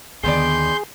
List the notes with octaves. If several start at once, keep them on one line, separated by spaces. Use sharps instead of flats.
D#2 D3 D#3 B3 G#4 D5 C6 G6